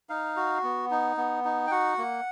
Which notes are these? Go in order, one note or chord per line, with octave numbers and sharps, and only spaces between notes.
D#4 F5
F#4
B3
D#4
B3
D#4
G5
F#4 F#5
A#3